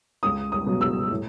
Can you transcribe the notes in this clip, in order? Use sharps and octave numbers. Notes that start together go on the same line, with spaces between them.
C#2 D#6
D#6
B2 F#3 B3
E6
A2